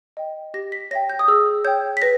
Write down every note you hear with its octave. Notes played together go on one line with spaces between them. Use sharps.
D#5 G5
G4 A#6
B6
C#5 E5 G5 A#6
G6
D#6
G#4 E6
C#5 G5 G6
B6
B4 A#6